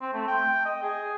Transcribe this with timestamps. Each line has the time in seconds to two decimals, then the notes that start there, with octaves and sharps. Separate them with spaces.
0.01 C4
0.13 A3
0.28 G5
0.65 D#5
0.83 G#4